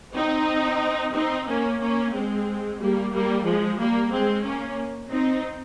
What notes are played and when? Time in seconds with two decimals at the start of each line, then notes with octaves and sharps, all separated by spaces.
0.14 C4 D#4
1.14 C4 D#4
1.47 A#3 C#4
1.80 A#3 C#4
2.13 G#3 C4
2.80 G3 A#3
3.13 G3 A#3
3.45 F3 G#3
3.78 G3 A#3
4.11 G#3 C4
4.44 A#3 C#4
5.10 C4 D#4